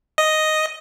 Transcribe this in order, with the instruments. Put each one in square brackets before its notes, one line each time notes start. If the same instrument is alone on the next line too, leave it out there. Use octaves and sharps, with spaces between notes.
[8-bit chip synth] D#5